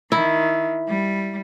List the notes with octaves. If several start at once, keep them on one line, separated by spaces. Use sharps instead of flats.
D#3 E4
G3